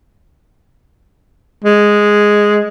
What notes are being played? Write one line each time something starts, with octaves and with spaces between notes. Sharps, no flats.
G#3